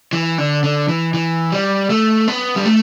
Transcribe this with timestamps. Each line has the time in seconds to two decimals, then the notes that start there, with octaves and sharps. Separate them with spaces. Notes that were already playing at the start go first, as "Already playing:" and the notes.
0.13 E3
0.38 D3
0.64 D3
0.89 E3
1.14 E3
1.52 G3
1.90 A3
2.28 B3
2.56 G3
2.66 A3